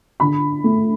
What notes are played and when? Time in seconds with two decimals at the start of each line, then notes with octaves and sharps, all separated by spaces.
0.20 D3 B5
0.64 A3